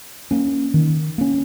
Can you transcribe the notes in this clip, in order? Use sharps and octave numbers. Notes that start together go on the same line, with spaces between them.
A#3 C#4
D#3
A#3 C#4